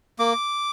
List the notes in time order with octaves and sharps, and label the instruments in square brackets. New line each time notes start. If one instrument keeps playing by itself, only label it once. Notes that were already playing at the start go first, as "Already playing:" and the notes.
[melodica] A#3 D6